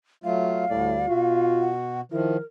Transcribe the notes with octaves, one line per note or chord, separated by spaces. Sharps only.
F#3 A3 F4 F5
D2 A2 G3 D5
B2 F4 F#4
F#5
D#3 F3 E4 A#4